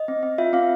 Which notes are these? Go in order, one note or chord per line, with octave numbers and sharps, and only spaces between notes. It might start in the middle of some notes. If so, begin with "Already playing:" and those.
Already playing: D#5
C4
C4
F4 E5
C4 F5